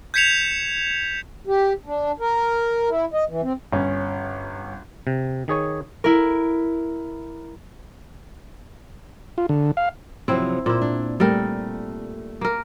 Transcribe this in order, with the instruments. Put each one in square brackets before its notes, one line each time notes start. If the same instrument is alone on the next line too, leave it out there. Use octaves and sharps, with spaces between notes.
[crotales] G6 G#6 B6 C#7 E7 F7
[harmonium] G4
D4
A#4
E4
D#5
E3
C4
[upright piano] G1 C#4
[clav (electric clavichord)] C3
D#3 G#4 C#5 G#5
[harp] E4 A#4
[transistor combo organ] F4
D3
F5
[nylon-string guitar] C3 F3 F#3 [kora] C4 E4
[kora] A#2 E4 [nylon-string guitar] C5
[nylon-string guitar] D4
[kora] G3 A#4 [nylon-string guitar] A3 A4 G5
[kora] A#3 A#4